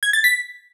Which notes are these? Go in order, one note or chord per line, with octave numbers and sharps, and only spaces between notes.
G#6
A6
B6